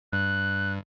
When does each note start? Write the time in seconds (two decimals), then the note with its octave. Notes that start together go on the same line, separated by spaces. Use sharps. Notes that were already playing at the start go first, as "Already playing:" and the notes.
0.13 G2 F#6